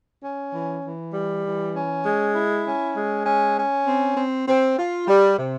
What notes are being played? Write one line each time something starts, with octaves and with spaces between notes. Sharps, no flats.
C#4
E3
E3
G3
E3
C#4
G#3
E4
C#4
G#3
C#4
C#4
C4
C4
C4
F4
G3
C3